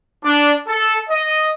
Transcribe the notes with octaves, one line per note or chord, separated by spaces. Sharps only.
D4
A4
D#5